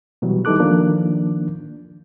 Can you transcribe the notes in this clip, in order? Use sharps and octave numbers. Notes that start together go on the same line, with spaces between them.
B2 E3 F#3 G3
E3 G3 D#4 A4 D6 F#6
D#3 F3 A#3 D4